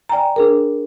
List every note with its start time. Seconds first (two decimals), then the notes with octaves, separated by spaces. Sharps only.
0.09 D5 G5 G#5 A#5
0.36 D4 G#4 A#4